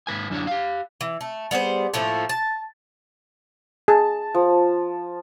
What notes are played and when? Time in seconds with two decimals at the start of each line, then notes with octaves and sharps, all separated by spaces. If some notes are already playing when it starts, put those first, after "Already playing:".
0.07 G#2 B4 G#5
0.30 F#2 D3 D4 E4 C#5
0.47 G4 F5
1.01 E3
1.21 A3
1.51 G3 B3 G#4 C5
1.94 A2 F3 A3 A#3
2.29 A5
3.88 G#4 A5
4.34 F3